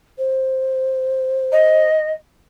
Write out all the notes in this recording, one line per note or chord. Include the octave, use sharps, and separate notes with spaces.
C5
D#5